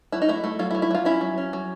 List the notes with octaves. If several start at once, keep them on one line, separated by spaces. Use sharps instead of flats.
F#3 E4
D#4
A3 E4
A3
F#3 F4
E4
F#3
E4
F#3 F4
C#4 E4
F#3
C#4
F#3